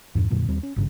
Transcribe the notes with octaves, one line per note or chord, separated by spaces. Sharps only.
E2 G2 A#2
F2 A#2 D3 F#3
D#2 G3 C4
C#4
G#1 G2 C#3